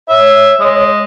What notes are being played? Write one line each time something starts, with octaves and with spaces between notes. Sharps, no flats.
C#5 E5
G#3